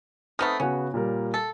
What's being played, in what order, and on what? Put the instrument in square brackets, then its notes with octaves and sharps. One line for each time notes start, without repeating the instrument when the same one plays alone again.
[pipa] A3 B3 D#4 [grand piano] C4 D#6 F6
[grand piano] C#3 B3 F#4 [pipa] C#4
[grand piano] A#2 G3 A#4
[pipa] A4